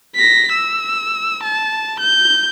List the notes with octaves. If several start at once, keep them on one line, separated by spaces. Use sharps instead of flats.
A#6 B6
E6
A5
G6